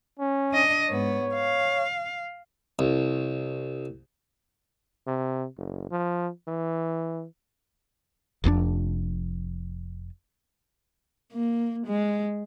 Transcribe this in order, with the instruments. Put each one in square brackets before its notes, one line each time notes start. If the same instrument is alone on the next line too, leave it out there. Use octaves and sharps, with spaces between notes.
[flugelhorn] C#4
[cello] D4 D#5
[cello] G#2 B3 [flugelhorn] C#5
[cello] F5
[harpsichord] C2
[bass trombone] C3
F#1
F3
E3
[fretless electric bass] F1 F2 A2 D4
[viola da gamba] A#3
G#3